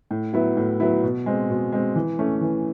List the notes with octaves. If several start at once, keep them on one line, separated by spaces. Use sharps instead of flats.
A2
F#3 B3 E4
A2
F#3 B3 E4
B2
G#3 C4
B2
G#3 C4
E3
A3 C#4
E3